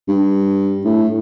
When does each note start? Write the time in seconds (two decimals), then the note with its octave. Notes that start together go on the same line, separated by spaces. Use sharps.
0.08 G2
0.85 A2